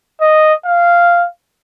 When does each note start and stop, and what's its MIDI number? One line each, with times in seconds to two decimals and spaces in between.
0.21 0.54 75
0.65 1.25 77